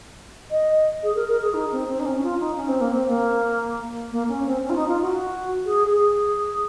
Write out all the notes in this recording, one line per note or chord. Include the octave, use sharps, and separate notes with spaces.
D#5
G#4
A#4
A#4
G#4
D#4
C4
C4
D#4
C#4
F4
D#4
C#4
C4
A#3
C4
A#3
A#3
C#4
C4
C#4
F4
D#4
F4
F#4
G#4
G#4